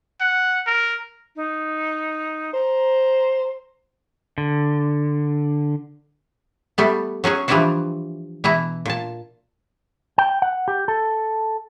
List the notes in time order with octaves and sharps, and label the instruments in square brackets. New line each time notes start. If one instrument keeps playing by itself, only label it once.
[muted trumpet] F#5
A#4
[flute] D#4
[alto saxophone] C5 [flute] A#5
[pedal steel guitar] D3
[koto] G3 A3 B3
F#3 C#4 F#4 G#4
E3 F3 G3 D4 E4 F#4
B2 E3 E4 A#5
A#2 A5
[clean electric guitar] G5
F#5
G4
A4